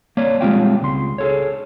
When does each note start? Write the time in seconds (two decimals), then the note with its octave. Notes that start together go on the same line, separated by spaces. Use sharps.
0.17 A#3 C#5 D5
0.41 G3 G#3 C4 F4 F5 G5
0.82 C#2 C6
1.18 G#4 A4 C#5